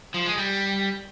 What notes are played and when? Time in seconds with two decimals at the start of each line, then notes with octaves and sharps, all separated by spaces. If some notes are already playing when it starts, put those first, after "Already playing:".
0.14 F3
0.26 G#3
0.38 G3